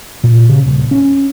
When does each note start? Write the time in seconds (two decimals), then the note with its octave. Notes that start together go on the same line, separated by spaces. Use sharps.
0.24 A#2
0.49 C#3
0.66 D#1
0.91 C#4